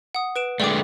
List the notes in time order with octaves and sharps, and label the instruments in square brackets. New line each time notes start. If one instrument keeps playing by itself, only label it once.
[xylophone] F#5 D#6
B4 D7 E7
[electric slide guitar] D3 G#3 A3 [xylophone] D5 G5 D6